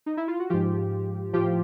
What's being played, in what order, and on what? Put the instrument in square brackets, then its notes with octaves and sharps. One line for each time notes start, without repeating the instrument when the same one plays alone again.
[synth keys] D#4
E4
F4
F#4
G#2 F3 F4 G4
A2 F3 F4 G4